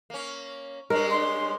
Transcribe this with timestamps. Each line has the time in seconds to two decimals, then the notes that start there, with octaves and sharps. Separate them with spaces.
0.10 A#3 C#4
0.90 G2 G#3 C#4 A#4
1.10 C6